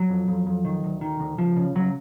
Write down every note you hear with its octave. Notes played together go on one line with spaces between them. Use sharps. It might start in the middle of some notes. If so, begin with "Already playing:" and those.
Already playing: F#3
F2
F2
F2
D#3
D2
D#3
D2
C#2 F3
C#3
C#3 F#3